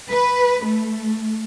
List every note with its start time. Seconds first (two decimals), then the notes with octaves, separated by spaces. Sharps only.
0.10 B4
0.65 A3